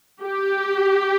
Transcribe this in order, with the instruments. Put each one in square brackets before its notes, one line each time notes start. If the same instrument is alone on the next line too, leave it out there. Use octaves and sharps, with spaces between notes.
[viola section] G4